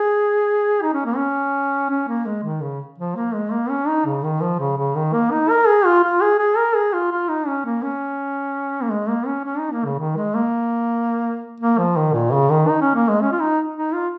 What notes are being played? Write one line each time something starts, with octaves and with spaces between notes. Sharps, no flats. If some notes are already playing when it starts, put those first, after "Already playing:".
Already playing: G#4
D#4
C#4
A#3
C#4
C#4
A#3
G#3
D#3
C#3
F3
A#3
G#3
A#3
C#4
D#4
C#3
D#3
F3
C#3
C#3
D#3
A#3
D#4
A#4
G#4
F4
F4
G#4
G#4
A#4
G#4
F4
F4
D#4
C#4
A#3
C#4
A#3
G#3
A#3
C#4
C#4
D#4
A#3
C#3
D#3
G#3
A#3
A#3
F3
D#3
A#2
C#3
D#3
D#4
C#4
A#3
G#3
C#4
F4
D#4
D#4
F4